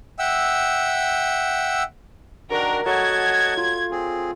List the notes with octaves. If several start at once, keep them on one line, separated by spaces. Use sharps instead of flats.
E5 F#5 G5 E6
D#3 D4 F#4 A#4
F#3 A3 D#5 F#5 A5 G#6
F4
C4 G#4